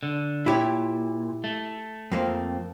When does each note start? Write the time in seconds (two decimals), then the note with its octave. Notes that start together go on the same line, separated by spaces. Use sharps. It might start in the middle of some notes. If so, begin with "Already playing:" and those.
0.03 D3
0.46 A#2 E4 G4 C#5
1.44 A3
2.12 F2 A#3 C4